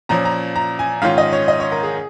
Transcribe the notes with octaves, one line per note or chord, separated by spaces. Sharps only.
A#2 F3 C#4 A#5
A#5
A#5
G#5
G#2 D#3 C#4 F4 F5
D#5
C#5
D#5
C#5
A#4
G#4